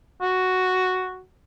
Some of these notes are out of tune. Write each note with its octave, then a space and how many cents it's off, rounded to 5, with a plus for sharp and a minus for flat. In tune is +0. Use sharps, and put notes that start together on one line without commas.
F#4 +0